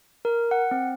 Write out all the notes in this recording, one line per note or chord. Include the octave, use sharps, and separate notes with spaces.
A#4
F#5
C4